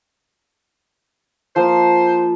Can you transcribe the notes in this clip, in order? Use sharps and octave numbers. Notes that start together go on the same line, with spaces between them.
F3 A#3 C5